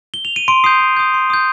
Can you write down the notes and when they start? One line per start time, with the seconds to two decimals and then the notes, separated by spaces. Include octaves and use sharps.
0.14 G7
0.25 F7
0.36 D#7
0.48 C6 D7
0.64 D#6 G6 C7
0.80 C6
0.97 D#6 G6
1.14 C6
1.30 D#6 G6